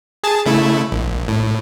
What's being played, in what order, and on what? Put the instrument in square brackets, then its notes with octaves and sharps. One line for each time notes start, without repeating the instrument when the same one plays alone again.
[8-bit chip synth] G#4 A5 A6
C#3 A3 E4
A#1
A2